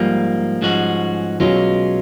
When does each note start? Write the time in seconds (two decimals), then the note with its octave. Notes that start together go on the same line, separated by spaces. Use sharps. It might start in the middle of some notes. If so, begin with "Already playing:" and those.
Already playing: G#2 F3 G3 A#3
0.62 G#2 F3 G#3 C#4 F#4
1.40 B2 F#3 G#3 C#4 F4